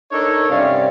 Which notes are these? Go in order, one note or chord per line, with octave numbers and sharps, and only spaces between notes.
D4 D#4 A4 A#4 C#5
G2 C3 C#4 D5 F5